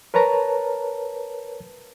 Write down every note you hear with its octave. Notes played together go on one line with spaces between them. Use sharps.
A#4 B4 C#5 A5 A#5